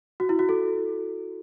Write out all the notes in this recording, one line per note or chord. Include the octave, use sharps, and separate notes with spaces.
F#4
E4
F#4
A4